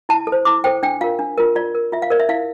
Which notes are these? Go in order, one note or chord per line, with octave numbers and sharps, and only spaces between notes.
E4 A5
A4
C5
E4 D6
A4 C5 G5
D4 G5
F4 A#4 F5
D4
F4 A#4
F4 D5
A#4
F4 E5
F5
A#4 D5
E5
E4 F5